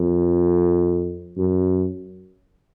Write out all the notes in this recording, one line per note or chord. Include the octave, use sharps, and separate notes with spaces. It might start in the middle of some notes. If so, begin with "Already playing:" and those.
Already playing: F2
F#2